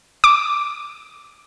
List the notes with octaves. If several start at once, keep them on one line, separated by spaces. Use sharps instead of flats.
D6